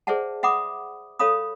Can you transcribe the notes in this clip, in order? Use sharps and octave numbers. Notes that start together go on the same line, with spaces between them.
G#4 C5 D5 E5 F#5 A5
E5 F#5 B5 D6 D#6
A4 C#5 F5 B5 D#6